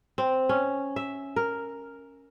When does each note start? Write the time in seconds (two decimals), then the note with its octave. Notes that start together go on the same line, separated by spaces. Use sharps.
0.18 C4
0.49 C#4
0.96 E5
1.36 A#4